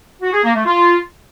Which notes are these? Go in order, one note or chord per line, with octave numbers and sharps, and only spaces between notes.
F#4
G#4
A#3
A3
F4